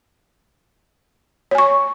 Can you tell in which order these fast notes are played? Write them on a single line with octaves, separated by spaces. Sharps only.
C#5 G#5 C#6